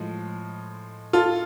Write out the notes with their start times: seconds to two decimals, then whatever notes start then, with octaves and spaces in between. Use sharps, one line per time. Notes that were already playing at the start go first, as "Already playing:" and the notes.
Already playing: A2 F3 G#3
1.13 F4 A4